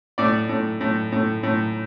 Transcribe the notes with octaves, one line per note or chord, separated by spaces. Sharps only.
A2 D5
A2
A2
A2
A2